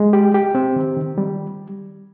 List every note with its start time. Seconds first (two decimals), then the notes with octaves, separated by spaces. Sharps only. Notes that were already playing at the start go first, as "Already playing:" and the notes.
Already playing: G#3
0.13 G4
0.34 G4
0.55 C4
0.76 D#3
0.97 D#3
1.18 G3